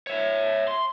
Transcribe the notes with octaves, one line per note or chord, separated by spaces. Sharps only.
C#5 E5
C6